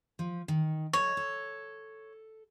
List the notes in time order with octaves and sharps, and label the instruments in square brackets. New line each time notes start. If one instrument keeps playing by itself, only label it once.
[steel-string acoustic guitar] F3
D#3
[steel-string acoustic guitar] F#3 A4 D#5 [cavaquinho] C#5
[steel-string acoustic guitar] A4